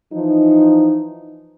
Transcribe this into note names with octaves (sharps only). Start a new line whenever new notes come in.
E3 F3 D#4